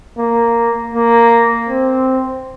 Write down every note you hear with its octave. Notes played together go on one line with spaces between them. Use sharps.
A#3
A#3
C4